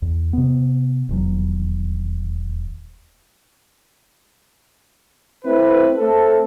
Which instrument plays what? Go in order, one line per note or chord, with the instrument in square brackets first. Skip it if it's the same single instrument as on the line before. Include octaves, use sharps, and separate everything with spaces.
[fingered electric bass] E2
C3 B3
D#1 E2 F#3
[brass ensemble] A3 C4 E4 B4
A3 C4 A4